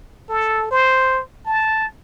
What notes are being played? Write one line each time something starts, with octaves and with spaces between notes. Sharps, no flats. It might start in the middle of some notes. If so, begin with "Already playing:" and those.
A4
C5
A5